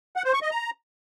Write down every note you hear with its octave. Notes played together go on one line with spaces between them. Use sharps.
F#5
C5
C#6
D#5
A#5